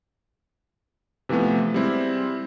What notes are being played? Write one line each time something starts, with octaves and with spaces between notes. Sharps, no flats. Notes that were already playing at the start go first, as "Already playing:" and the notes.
C3 E3 F3 A3 B3
G3 G#3 C4 E4